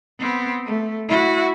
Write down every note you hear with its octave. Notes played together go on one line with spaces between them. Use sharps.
B3 C4
A3
E4 F#4